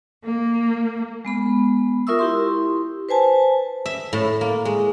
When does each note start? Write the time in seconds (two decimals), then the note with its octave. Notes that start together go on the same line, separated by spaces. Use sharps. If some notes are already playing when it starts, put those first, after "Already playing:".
0.25 A#3
1.25 G#3 B3 B5
2.07 F4 A#4 E5 C#6 D#6 E6
2.19 E4 G4 C6
3.09 B4 C5 G#5 A5
3.86 E5
4.13 A2
4.41 A#3
4.65 G#3